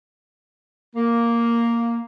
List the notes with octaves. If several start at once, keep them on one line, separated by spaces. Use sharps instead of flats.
A#3